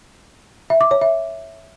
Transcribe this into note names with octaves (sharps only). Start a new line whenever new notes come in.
E5
D6
C#5
E5